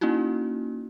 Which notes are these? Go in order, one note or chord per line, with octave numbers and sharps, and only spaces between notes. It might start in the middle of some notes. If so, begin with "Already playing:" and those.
A#3 C#4 D#4 E4 F#4